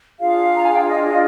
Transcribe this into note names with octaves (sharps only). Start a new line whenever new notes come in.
D4 F4 G#4 F5
A#5
G#5
G5
F5
D#5